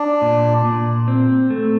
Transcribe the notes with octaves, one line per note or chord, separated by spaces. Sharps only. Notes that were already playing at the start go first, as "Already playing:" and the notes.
Already playing: D4
A#2
A#2
C4
A3